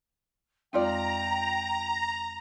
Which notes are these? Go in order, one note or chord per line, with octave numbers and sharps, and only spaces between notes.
F2 G#3 C4 D#4 F4 D5 G5 A#5